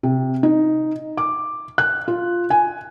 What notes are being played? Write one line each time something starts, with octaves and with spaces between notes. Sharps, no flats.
C3
D#4
D6
F#6
F4
G#5